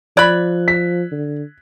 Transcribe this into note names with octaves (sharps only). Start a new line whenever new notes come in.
F3 D5 B5 F#6 G#6
B6
D3